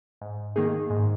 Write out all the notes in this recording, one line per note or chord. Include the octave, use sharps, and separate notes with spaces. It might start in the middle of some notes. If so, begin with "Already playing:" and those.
G#2
D#3 A#3 D#4 G#4
G#2